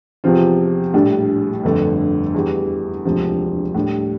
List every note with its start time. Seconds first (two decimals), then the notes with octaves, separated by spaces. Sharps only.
0.24 E2 C3 F3 C4 F4
0.94 A#1 A2 G3 D4
1.64 G1 F2 D3 A3 D4
2.34 E2 E3 G3
3.05 E1 D2 C3 F3
3.74 A2 G3 D4